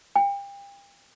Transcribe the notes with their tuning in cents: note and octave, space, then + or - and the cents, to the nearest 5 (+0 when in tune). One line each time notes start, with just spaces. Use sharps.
G5 +35